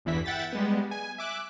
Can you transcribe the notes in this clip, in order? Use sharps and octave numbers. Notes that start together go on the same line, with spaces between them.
G1 E2 E3 E4 B6
E5 F#5 G5 A6 B6
G3 G#3 B3
G#5
E5 D6 F#6